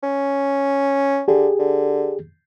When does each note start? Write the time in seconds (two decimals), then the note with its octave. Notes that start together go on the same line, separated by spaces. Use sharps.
0.03 C#4
1.28 D3 G4 G#4
1.59 D3